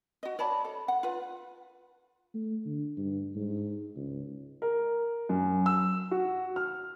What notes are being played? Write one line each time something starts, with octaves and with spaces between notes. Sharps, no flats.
F#4 D#5
C#5 D5 A5 B5
A4
F#5
F4 B4
A3
D3
G2
G#2
C#2
A#4
F#2
E6
F#4
F6